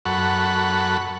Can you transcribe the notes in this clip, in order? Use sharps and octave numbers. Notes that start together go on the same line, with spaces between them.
F#2 A4 F#5 B5 C#6